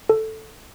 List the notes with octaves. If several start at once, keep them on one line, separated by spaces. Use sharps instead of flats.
A4